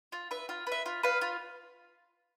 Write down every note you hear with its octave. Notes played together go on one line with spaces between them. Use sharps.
F4
B4 E5
F4
B4
E5
F4
B4 F5
F4